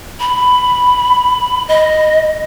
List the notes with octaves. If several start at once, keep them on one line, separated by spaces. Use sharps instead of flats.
B5
D#5